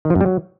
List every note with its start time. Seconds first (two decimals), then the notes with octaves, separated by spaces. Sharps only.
0.05 D#3
0.10 F3
0.15 F#2
0.21 G3
0.26 F#3